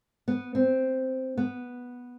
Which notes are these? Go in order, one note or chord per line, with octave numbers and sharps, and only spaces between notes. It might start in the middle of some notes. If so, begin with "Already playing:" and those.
B3
C4
B3